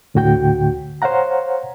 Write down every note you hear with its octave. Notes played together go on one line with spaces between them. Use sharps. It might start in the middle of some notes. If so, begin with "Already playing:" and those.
D2 A2 D3 F#4 G5 G6
C5 C#5 F5 F#5 A#5